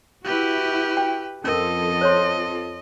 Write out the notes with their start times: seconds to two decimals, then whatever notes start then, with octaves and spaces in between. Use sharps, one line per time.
0.25 E4 F#4 G4 B4
0.97 G5
1.44 F2 C#4 F4 A4 A#4 D#5
2.01 C5 C#5 C6